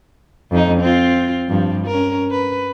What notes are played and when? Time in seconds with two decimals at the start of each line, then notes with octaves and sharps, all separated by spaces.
0.51 F2 D#4
0.80 C4 F4
1.48 G2 F3
1.87 C#4 A#4
2.31 B4